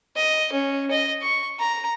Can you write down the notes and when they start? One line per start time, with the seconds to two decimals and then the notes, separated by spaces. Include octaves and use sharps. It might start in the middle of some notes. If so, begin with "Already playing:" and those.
0.16 D#5
0.52 C#4
0.91 D#5
1.22 C#6
1.59 A#5